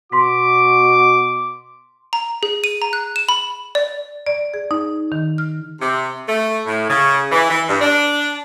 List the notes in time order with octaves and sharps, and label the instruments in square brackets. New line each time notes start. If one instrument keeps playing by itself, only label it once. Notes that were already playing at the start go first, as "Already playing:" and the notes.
[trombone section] B2 F#4 [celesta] C6 B6 [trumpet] D6
[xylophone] A#5
G#4
D#7
A#5
F#6
E7
B5
D5
[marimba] D5
G#4
D#4
D#3
F6
[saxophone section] C3
A3
A2
C#3
E3
E3
G2
D4